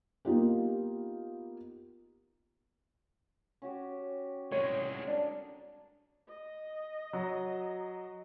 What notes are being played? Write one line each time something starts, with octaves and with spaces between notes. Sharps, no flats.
A#3 B3 D#4 F4 G4
C#4 F#4 G4
C2 G#3 C#5
D4 A#4 A5
D#5
F#3 A#5